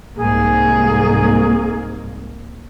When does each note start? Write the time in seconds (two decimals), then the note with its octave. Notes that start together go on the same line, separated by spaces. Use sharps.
0.16 C2 G#2 A#3 G#4